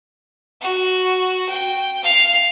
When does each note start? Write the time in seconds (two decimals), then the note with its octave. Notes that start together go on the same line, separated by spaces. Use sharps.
0.61 F#4
1.49 G5
2.03 F5